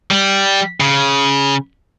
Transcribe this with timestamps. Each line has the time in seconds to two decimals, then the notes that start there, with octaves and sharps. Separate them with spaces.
0.11 G3
0.80 C#3